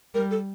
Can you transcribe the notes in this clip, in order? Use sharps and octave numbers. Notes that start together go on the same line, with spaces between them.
G3 A#4
A4